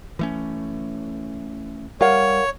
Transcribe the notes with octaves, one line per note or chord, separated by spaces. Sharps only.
E3 A3 C#4
G3 A#4 C#5 F5 F#5